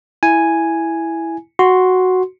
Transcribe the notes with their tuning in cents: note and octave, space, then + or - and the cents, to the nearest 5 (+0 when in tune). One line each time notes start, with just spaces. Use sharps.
E4 +0 G#5 +0
F#4 +0 C6 +0